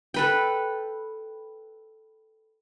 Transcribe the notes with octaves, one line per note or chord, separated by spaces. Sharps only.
A4 B4 G5